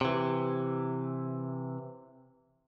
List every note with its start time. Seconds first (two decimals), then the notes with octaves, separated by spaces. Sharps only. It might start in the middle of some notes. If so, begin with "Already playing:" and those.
0.01 C3 E3